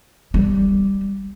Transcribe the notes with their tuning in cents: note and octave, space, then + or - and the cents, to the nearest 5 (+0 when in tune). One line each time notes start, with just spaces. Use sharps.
G3 +0